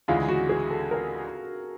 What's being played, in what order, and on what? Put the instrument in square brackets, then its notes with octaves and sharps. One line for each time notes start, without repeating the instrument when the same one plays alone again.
[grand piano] D2 C#3 E3 G#3 [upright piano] F4
[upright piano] F#4
G#4
A4
A#4